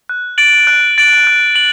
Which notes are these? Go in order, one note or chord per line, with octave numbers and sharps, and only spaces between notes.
F#6
A6 D7 F#7
F#6
A6 D7 F#7
F#6
F#7